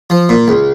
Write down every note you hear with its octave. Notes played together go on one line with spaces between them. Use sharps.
F3
A#2
C#2